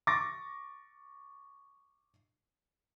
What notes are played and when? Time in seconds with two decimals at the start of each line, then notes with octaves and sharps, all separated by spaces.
0.07 C#6 D6 A6 A#6